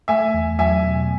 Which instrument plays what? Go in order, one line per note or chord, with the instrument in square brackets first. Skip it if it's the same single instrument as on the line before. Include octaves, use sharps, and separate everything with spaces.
[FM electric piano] A3 [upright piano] E5 G#5
[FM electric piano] E2
[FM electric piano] F#3 [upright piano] E5 G#5
[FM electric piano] B2